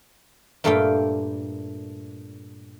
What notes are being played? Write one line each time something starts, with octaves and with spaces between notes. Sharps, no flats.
G2 A#2 A3 A4 F5 G5